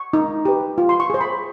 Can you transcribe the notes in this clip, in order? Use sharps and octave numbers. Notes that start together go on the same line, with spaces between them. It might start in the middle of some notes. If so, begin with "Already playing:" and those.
Already playing: C#6
D#4
G4 B4
F4
C6
C#6
G#4 C5
B5